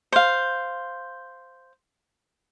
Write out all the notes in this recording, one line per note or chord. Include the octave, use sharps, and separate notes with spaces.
C5 F5